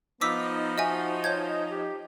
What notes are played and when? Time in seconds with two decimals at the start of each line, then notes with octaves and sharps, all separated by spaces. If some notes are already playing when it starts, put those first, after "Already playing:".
0.21 F3 B3 D#4 D6 E6 B6
0.78 F#4 D#5 E5 G#5
1.24 C#5 G6 G#6
1.52 D#5
1.71 G4